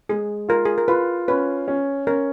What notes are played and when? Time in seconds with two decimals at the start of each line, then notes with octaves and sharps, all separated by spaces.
0.09 G#3 G#4
0.49 F4 A#4
0.65 G#4
0.78 A#4
0.88 F4 B4
1.28 C#4 B4
1.68 C#4
2.07 C#4 A#4